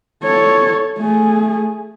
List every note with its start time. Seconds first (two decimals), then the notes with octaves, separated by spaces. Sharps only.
0.23 A4 C#5
0.98 A3 G#4